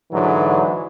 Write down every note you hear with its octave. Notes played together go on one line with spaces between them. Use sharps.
G#2 D3 E3 F#3